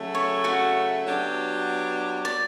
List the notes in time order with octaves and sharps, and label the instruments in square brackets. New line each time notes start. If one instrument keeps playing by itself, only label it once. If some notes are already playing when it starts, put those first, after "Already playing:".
Already playing: [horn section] C#3 F#3 A3
[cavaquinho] C#5
F#4 F#5
[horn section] F#3 B3 D4 G4
[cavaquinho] D5